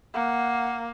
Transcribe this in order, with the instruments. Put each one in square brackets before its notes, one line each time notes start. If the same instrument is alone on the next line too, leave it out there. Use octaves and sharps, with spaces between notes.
[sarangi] A#3 [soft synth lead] F#5